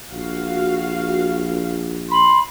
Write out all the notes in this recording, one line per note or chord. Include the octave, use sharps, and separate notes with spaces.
A#1 F#4 F5
B5 C6